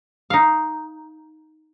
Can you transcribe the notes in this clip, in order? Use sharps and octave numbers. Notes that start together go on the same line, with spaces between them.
D#4 F5